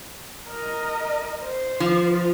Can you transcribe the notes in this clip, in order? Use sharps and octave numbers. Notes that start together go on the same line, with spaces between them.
A#4 D#5
C5
F3